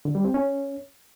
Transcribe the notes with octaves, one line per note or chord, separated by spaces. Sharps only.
D3
G3
C4
C#4